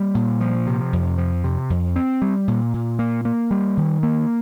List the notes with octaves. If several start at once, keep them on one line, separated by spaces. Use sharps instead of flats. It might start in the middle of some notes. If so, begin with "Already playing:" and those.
Already playing: G3 A#3
A#2
F3
C3
F2
F3
C3
F2
C4
G3
A#2
A#2
A#3
A#3
G3
D#3
A#3